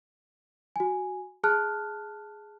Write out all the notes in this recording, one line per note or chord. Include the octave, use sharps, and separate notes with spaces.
F#4 G#5
G#4 A5 F6 F#6